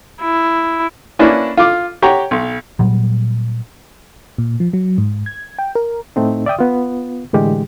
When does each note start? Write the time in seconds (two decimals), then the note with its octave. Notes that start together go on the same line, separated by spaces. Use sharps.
0.22 E4
1.19 A#3 C#4 D4 E4 B4
1.57 F4 D6
2.02 G4 C#5 F#5 G5 A#5
2.31 B1
2.79 A#2 F#3 G3
4.38 A#2
4.60 F3
4.73 F#3
4.98 G#2
5.26 G#6
5.59 G5
5.75 A#4
6.16 A2 A3 C4 D#4
6.46 D5 E5 G5 D#6
6.59 B3 F4
7.33 A2 D3 E3 G#3 G4